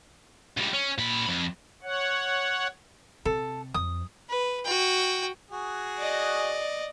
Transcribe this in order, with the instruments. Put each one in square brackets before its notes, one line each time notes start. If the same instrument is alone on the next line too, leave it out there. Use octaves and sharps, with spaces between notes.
[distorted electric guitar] C#2 G3
C#4
A#2 B5
F2
[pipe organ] C#5 F#5
[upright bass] C3 [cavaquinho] A4
[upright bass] F2 [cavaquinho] D#6
[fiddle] B4
F#4 G5
[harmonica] F#4 G#4
[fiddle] D5 D#5